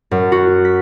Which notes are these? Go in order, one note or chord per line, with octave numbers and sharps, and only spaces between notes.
F#2
F#4
B6